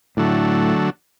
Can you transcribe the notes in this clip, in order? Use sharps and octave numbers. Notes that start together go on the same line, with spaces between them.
A2 D3 F#3 A3